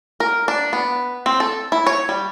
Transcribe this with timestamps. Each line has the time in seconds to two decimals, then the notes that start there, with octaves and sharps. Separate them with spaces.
0.20 A#4
0.48 D4
0.73 B3
1.26 C4
1.40 A4
1.72 E4
1.87 C#5
2.09 G3